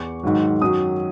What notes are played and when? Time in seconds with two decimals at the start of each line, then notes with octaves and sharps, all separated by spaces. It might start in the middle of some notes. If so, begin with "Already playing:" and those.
Already playing: E2 C#6
0.23 G#2 D#3 F#3
0.62 F#2 D#3 F#3 D#6